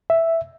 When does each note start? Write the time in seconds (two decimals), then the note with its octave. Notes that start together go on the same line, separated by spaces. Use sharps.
0.10 E5